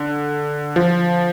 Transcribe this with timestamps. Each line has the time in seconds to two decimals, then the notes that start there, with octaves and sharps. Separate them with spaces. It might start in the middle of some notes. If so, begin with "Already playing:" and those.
Already playing: D3
0.76 F3